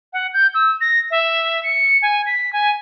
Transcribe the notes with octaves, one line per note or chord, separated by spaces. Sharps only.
F#5
G6
E6
A#6
E5
C#7
G#5
B6
G#5